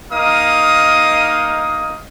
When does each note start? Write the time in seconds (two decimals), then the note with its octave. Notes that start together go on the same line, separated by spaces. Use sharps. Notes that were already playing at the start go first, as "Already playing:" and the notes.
0.12 A#3 D#4 A#4 D#5 F5 D#6